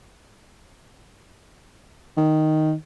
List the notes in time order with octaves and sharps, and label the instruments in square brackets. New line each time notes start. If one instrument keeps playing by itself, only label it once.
[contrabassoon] D#3